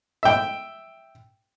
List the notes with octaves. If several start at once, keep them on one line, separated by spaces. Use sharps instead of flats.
E5 G5